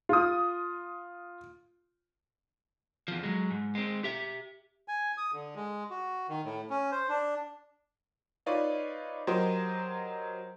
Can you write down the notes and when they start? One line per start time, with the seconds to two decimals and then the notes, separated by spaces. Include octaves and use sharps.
0.09 F4 D#6
3.08 E2 F3
3.23 F#3 G#3
3.51 G#2
3.75 G#3 C4
4.04 G4 E5
4.88 G#5
5.18 D#6
5.33 D3
5.55 G#3
5.90 F#4
6.29 D#3
6.44 A2
6.70 C#4
6.92 C5
7.09 D4
8.46 D#4 F4 B4 C#5 D5
9.27 F#3 G4 A#4 C5 D#5